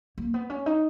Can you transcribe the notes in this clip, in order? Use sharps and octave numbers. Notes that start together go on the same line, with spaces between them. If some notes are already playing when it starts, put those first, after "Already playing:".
A#3
B3
C#4
D#4